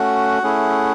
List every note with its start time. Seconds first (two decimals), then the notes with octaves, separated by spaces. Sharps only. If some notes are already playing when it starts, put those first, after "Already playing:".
Already playing: A3 C#4 F#4 F#5
0.43 A3 C#4 E4 G#4